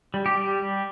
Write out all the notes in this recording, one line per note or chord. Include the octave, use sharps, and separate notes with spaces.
G3
G4
G3
G3